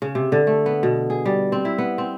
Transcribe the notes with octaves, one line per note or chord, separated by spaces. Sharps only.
C#3
C3
D3
A3
B3
B2
G#4
G3
C4
E4
B3
C4